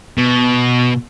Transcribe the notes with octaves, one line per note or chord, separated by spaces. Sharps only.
B2